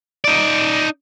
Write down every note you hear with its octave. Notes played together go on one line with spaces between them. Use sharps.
D#4 D5